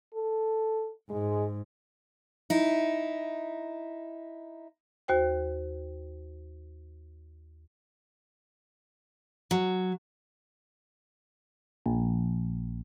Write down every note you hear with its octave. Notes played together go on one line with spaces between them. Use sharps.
A4
G#2 G#3
D#4 E4
D#2 F#4 C5 G5
F#3
A#1